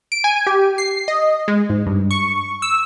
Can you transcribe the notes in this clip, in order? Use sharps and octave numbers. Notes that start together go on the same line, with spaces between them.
D7
G#5
G4
C7
D#5
G#3
G#2
G2
C#6
E6